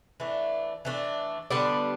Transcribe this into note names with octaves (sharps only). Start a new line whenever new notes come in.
E3 A3 D4
E3 A3 D4
D3 G3 B3 D4